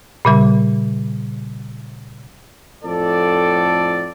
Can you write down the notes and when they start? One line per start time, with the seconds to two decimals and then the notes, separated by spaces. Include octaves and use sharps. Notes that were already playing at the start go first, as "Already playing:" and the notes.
0.25 A#2 C#3 G3
2.83 F2 A2 A4 D5